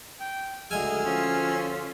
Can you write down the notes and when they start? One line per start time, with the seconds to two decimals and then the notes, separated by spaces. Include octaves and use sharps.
0.20 G5
0.71 D2 G#3 G#4 D#5 G#5 E6 F6
1.05 F3 C#4 F4